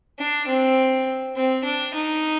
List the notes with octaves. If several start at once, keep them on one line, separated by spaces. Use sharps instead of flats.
D4
C4
C4
D4
D#4